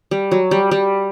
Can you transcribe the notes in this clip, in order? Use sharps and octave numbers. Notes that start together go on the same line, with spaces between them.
G3
F#3
G3
G3